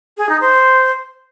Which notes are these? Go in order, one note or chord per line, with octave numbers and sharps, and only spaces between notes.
G#4
D#4
C5